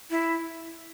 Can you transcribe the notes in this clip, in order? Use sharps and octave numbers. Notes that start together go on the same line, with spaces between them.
E4